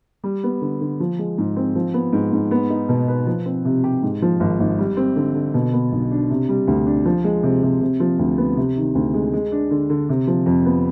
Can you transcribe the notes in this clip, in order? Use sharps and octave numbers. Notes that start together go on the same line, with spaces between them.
G3
B3
D3
D3
F3
G#3
G#2
C4
F3
B3
G#2
G#2
B3
D#4
B2
B4
F3
C4
C3
G4
G#2
F3
G#1
G#1
G3
C4
D3
D3
B2
B3
B1
D4
C3
G3
D2
D4
F3
G#3
C3
C3
C3
F3
D2
B3
C3
D#3
D2
G#3
G#3
D4
D3
D3
C3
F3
F2
B3